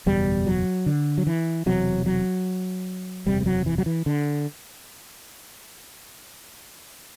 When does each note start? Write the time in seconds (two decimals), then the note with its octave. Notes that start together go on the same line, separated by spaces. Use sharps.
0.06 F#1 E2 B2 G3
0.47 F#3
0.86 D3
1.18 F#3
1.27 E3
1.66 E1 E2 C3 F#3
2.06 F#3
3.26 F#1 E2 C3 G3
3.41 G3
3.46 F#3
3.66 E3
3.78 F#3
3.86 E3
4.06 D3